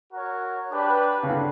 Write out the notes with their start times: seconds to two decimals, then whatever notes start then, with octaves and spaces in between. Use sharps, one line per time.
0.11 F#4 A#4 C#5
0.70 D4 G4 B4
1.23 C#3
1.30 D3